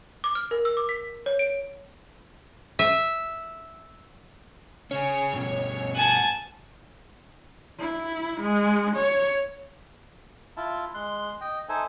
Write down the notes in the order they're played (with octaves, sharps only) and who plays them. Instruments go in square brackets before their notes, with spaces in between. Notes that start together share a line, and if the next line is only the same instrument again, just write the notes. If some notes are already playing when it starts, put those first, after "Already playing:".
[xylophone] D6
F6
A#4
E6
D6
B6
C#5
D7
[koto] E5
[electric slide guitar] C#3 C#4 [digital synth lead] C#5
[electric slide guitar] G2 B2
[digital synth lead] F#5 [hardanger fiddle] G#5 A5
[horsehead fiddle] E4
G#3
C#5
[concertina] E4 F4 E5 A5
G#3 C6 F#6
D#5 G5
D#4 A4 C5 E5 G#5